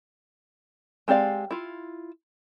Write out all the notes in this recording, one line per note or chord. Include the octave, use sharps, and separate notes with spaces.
G#3 C4 G4 D5 F5
E4 F4